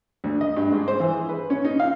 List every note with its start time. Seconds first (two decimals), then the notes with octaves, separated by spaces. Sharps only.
0.24 D2
0.41 D#5
0.57 G2
0.72 G#2
0.88 C5
1.00 E3
1.14 G#4
1.29 B4
1.50 C#4
1.65 D#4
1.80 F5